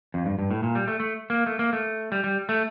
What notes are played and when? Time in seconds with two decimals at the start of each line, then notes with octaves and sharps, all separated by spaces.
0.14 F2
0.26 G2
0.39 G2
0.51 A2
0.63 A#2
0.75 G3
0.88 A3
1.00 A3
1.30 A#3
1.46 A3
1.59 A#3
1.73 A3
2.12 G3
2.24 G3
2.49 A3